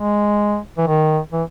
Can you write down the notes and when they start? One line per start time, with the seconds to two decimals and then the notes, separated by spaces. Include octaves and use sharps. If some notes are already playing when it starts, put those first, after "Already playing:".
Already playing: G#3
0.78 E3
0.87 D#3
1.32 E3